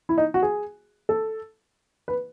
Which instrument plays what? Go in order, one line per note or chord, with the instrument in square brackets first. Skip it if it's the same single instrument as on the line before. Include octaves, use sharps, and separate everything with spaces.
[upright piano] E4
D#4
F#4
G#4
A4
B4